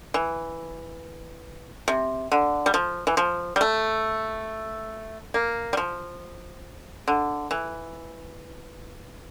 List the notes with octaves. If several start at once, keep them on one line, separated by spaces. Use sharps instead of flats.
E3
C3
D3
G3
F3
E3
F3
G3
A3
A#3
G3
F3
D3
E3